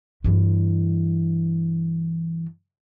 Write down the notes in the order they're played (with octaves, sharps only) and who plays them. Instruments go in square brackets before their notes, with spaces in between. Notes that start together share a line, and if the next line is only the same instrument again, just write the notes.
[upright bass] G2 E3